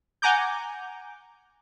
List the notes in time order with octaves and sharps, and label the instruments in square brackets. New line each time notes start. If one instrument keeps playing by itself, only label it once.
[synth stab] F#5 G#5 A#5 D6 G6